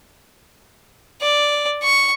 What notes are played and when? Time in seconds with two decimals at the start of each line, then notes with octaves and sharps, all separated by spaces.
1.21 D5
1.84 C#6